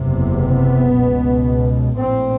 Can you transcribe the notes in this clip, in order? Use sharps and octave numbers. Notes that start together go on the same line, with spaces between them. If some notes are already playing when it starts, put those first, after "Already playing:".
Already playing: F#1 E2 C3
B3
C#2 B2
A#1 A2 C4